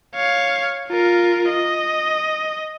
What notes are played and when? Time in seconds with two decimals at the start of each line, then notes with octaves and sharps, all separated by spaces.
0.15 C#5 F5
0.88 F4 A#4
1.49 D#5